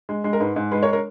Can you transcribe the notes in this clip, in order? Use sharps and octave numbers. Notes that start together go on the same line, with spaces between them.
G#3
G#3
A#4
G#2 B4
G#2
G#3 B4
A#4 C#5
A#4 C#5